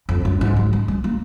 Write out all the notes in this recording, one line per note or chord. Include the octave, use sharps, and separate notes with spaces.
F2
F#2
G#2
F#3
G#3
G#3
A#3